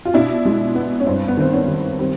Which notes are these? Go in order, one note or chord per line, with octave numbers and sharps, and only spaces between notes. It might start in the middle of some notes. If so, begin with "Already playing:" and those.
F4
B2 D4 E4
G#3
B3
C#4
G2 C4 D4
B3
D#3 C4
B3 C#4
D#3
G3 C4